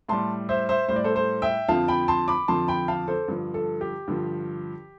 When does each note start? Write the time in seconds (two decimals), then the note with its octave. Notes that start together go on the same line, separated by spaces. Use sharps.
0.09 A2 G3 A5 C6
0.49 C5 E5
0.69 C5 E5
0.89 A2 G3 C5
0.96 D5
1.04 A4 C5
1.15 A4 C5
1.42 E5 G5
1.69 F2 D3 F3 F5 A5
1.88 G5 B5
2.08 A5 C6
2.28 B5 D6
2.48 F2 D3 F3 A5 C6
2.68 G5 B5
2.88 F5 A5
3.08 A4 C5
3.28 G2 D3 F3
3.54 A4
3.81 G4
4.08 G2 D3 F3